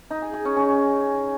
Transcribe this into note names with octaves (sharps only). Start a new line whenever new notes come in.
D#4
G#4
G#4
C#4
C#4